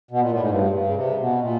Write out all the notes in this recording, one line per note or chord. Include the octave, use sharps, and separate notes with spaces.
B2
A#2
A2
G#2
G2
G2
C#3
C3
B2
A#2